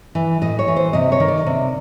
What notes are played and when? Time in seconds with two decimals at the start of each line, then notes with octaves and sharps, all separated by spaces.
0.15 E3
0.41 A2 D#5
0.59 C#5
0.68 E3
0.76 C5
0.93 C3 D#5
1.12 C#5
1.20 D#3
1.28 D5
1.46 C3